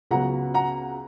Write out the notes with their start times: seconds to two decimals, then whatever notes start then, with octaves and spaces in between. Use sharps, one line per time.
0.11 C#2 C#3 F#3 B3 F#5 A#5
0.54 F#5 A#5